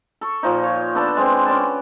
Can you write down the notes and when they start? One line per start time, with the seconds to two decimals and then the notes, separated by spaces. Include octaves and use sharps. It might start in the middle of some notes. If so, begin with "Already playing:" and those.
0.21 A4 C#6
0.43 A#2 F3 D#4
0.63 C#5
0.95 B3 D4 A4 A5
1.17 G#3 B3 C4
1.46 C#4 D5 A5